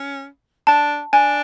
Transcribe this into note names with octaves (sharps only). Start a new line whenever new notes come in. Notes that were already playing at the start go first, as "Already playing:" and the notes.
Already playing: C#4
D4 A5
D4 G#5